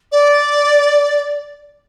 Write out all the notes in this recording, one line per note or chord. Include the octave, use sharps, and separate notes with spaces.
D5